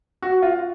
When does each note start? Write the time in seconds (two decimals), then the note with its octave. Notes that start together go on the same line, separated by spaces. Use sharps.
0.22 F#4
0.42 F4